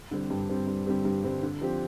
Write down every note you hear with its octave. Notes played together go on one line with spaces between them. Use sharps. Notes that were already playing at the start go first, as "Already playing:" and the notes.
D3 G3 C4 G4
G2
D3 G3 C4 G4
G2
D3 G3 C4 G4
G2
D3 G3 C4 G4
D3
F3 C4 G4